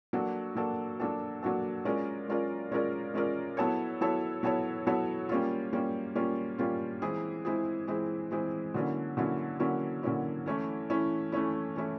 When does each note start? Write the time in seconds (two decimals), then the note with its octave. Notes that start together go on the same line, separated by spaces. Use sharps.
0.13 F#3 A#3 D4 F#4 A4
0.56 F#3 A#3 D4 F#4 A4
1.00 F#3 A#3 D4 F#4 A4
1.42 F#3 A#3 D4 F#4 A4
1.85 G#3 C#4 F4 A#4 D5
2.28 G#3 C#4 F4 A#4 D5
2.72 G#3 C#4 F4 A#4 D5
3.14 G#3 C#4 F4 A#4 D5
3.57 F#3 B3 E4 A4 C#5
4.01 F#3 B3 E4 A4 C#5
4.43 F#3 B3 E4 A4 C#5
4.87 F#3 B3 E4 A4 C#5
5.29 G3 A#3 C#4 F4
5.73 G3 A#3 C#4 F4
6.15 G3 A#3 C#4 F4
6.58 G3 A#3 C#4 F4
7.02 E3 G#3 C4 E4 G#4
7.45 E3 G#3 C4 E4 G#4
7.87 E3 G#3 C4 E4 G#4
8.31 E3 G#3 C4 E4 G#4
8.74 D3 F#3 A#3 C#4 E4
9.17 D3 F#3 A#3 C#4 E4
9.60 D3 F#3 A#3 C#4 E4
10.03 D3 F#3 A#3 C#4 E4
10.46 E3 A3 C#4 E4
10.90 E3 A3 C#4 E4
11.32 E3 A3 C#4 E4
11.76 E3 A3 C#4 E4